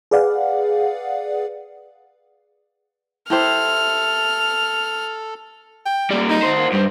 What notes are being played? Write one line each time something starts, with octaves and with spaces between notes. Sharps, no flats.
G#4 B4 D5 F5 F#5
E4 G4 A4 C5 F6
G5
G3 A#3 D5
D#4
F#4 C5
A#3
G2 G3 C5